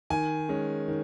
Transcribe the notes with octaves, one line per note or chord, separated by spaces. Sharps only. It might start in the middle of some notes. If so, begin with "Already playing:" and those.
D#3 G#5
G#3 C#4
D#3